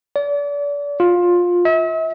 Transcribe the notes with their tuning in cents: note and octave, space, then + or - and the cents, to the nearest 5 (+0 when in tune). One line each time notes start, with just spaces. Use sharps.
D5 -35
F4 +15
E5 -40